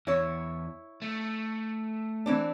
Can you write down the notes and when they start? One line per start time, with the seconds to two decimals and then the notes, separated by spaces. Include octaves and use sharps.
0.07 E2 E4 C#5
1.02 A3
2.26 E3 C4 D4